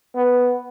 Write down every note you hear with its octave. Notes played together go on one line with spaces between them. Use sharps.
B3